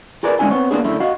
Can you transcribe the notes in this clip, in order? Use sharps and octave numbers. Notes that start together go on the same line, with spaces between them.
F4 G#4 A#4 B4 D5
D3 G#3 C#4 D4 F4 G#5
B3 C4 C#5
A#3 B3 D4 G#4
F#2 D3 A3 E4
F#4 D#5 F5